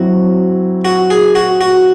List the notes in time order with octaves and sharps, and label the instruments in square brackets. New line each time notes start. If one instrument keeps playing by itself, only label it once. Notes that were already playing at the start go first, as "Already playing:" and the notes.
Already playing: [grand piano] F#3 C4 E4 [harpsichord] F#4
[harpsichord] F#4
G#4
F#4
F#4